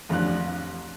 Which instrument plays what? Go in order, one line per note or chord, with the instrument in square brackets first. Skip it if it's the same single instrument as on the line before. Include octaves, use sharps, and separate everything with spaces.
[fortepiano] A1 F2 D4 F#6